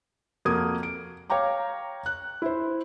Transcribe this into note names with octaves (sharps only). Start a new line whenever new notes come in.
F2 A#3 F#4 A#4 D#6 G#6
D7
C#5 F5 G5 A#5 D6
F#6
E4 C5